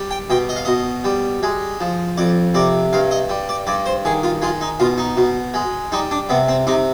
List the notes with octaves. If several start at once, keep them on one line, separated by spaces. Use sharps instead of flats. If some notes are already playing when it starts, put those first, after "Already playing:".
Already playing: G3
G5
B2 G5
D#5
F5
B2 D#5
G3
G#3
F3
F2 D5
C3 D5
G2 F5
D#5
G3
D5
G2 D5
C5
D#3 G#4
F4
G#3 F4
D#4
B2 F4
D#4
B2
G#3
G3 D#4
D4
C3 B3
C4
C3 D#4